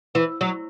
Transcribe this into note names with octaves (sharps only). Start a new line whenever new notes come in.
E3
F#3